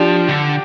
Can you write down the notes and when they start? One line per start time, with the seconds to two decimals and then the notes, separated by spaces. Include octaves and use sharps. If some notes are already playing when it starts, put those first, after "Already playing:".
Already playing: F3 D4 G4
0.28 D3